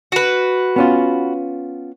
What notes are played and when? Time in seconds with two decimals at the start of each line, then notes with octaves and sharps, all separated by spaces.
0.12 F#4 B4
0.76 B3 C#4 F4